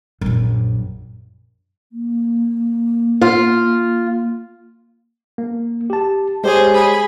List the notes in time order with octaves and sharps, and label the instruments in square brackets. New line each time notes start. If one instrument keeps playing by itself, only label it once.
[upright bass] A#1 F#2
[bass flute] A#3
[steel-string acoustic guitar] F4
[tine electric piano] A#3
G4 A5
[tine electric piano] G#3 G4 C#5 [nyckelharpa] G#4 C5
[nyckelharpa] G#4 B5